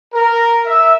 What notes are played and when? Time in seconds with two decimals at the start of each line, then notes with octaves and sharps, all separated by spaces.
0.14 A#4
0.66 E5